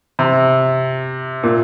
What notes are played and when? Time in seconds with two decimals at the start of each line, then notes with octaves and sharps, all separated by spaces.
0.19 C3
1.43 A#2